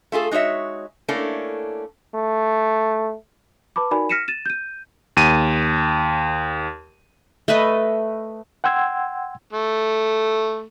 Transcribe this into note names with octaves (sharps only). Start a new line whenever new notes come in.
A3 F4 G#4 A4
G#3 D#4 F#4 C#5 E5
A3 A#3 C#4 D4 E4 A4
A3
B4 A5 B5 D6
D#4 F#4 A#4 D5 G#5 B5
F6 A#6 B6 C#7 D#7 E7
A6 D#7 E7
G6 D#7
D#2 D#7
A3 B4 D#5
F#5 G5 C6 E6 G#6
A3